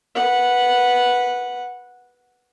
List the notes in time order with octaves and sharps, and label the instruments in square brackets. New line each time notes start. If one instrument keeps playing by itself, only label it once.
[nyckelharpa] B4 F#5